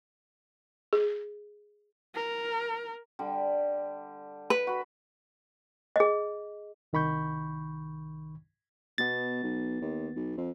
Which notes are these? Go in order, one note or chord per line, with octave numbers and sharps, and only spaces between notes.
G#4
A#4
D3 G3
B4
F#4 B5
G#4 D#5
C2 D#3 B5 C#6 G6
B2 B3 A6
B1
D#2
B1
F2